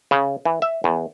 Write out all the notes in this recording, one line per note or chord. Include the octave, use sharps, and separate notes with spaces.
C#3
E3
E5
E2